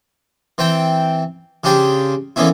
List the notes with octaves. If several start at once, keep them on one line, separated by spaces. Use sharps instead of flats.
E3 C4 G5 A5
C#3 C#4 D4 G4 C5 A5
D3 E3 A#3 B3 C#4 E4